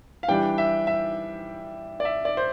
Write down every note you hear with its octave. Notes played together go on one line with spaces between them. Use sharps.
F5
E3 G3 D4 G5
E5
E5
D5
E5
D5
C5